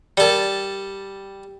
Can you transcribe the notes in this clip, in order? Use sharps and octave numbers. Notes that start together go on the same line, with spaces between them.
G3 A4 A#4 D5